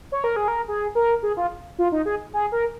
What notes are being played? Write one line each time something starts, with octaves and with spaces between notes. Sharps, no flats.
C#5
A#4
G#4
A#4
G#4
A#4
G#4
F4
F4
D#4
G#4
G#4
A#4